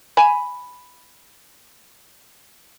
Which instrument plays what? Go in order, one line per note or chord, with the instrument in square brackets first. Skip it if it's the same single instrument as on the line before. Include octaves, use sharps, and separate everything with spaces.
[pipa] G#5 B5